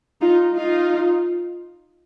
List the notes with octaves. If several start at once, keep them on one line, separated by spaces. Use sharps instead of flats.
D#4 F4
D#4 F4